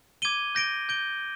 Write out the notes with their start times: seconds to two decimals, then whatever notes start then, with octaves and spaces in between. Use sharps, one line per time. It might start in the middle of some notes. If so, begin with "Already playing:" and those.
0.22 D6 G#6 D#7 G7
0.55 G6 A#6 D7 G7
0.89 G6 D7 G7